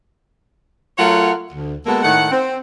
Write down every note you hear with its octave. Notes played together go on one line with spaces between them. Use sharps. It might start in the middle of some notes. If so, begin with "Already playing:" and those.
F#3 A3 F4 A#4 C#5 F#5
D2
G#3 A#3 B3 F#4 A4
A2 D#3 A3 F#5
C4